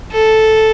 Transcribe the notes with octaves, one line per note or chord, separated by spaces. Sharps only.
A4